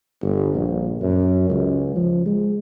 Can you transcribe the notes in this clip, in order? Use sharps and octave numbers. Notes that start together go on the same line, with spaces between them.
G1
A#1
F#2
C#2
F3
G#3